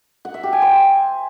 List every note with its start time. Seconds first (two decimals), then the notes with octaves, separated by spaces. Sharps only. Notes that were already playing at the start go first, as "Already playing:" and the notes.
0.25 F#5
0.34 E5
0.43 G4
0.53 G#5
0.62 C5